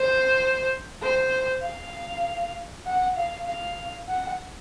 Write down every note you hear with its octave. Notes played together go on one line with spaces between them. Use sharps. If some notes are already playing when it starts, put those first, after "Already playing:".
Already playing: C5
C5
F5
F#5
F5
F5
F#5